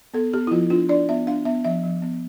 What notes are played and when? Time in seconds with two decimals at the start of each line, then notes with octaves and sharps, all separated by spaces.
0.14 B3 A4
0.34 B3 G4
0.47 E4
0.51 F3 F4
0.70 D4 F4
0.89 D4 D5
1.09 B3 E5
1.27 D4 F5
1.45 B3 E5
1.65 F3 E5
1.84 F3
2.02 B3